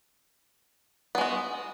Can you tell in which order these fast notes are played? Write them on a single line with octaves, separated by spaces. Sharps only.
B3 G#3 F#4